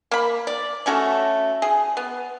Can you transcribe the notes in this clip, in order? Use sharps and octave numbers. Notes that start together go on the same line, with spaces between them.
A#3 B5
D5
A3 C#4 F#4 A4
G#4
B3